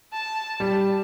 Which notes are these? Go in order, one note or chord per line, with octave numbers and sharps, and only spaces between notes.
A5
G3